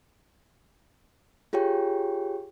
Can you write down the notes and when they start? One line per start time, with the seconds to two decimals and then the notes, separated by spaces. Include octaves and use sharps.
1.53 F4 G4 G#4 C#5 G5